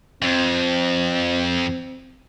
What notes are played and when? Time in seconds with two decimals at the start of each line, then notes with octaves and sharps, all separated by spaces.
0.22 F2 C4